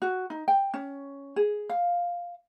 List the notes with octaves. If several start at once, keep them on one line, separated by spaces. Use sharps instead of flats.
F#4
D#4
G5
C#4
G#4
F5